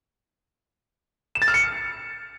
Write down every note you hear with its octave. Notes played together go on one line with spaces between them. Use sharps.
E7
A6
F6
C#7